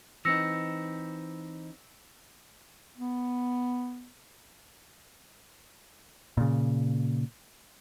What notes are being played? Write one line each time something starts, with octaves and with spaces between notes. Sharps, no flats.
E3 C4 D#4 E6 A#6 C#7
B3
A#2 C#3